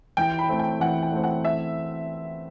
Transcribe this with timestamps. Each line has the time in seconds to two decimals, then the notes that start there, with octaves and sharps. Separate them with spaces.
0.17 E3 G5
0.39 B5
0.49 A3 C4
0.59 G5
0.80 E3 F#5
1.03 G5
1.12 A3 C4
1.24 F#5
1.45 E5